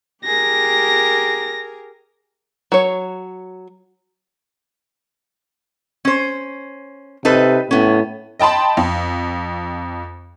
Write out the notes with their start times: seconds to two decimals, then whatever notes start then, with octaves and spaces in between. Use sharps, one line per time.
0.25 G4 G#4 A#4 A#6
2.72 F#3 C#5
6.05 C#4 C5
7.25 C3 D#4 A4 B4
7.71 A2 B3 C#4
8.39 D#5 G5 A5 B5 C6
8.77 F2